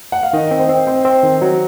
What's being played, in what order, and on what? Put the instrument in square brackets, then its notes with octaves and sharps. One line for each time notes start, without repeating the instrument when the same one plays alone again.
[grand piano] F#5
F5
[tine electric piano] D#3 [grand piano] D#5
[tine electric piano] C4
[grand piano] C5
[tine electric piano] C4
[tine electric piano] C4 [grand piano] C5
[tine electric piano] C4
D#3
F#3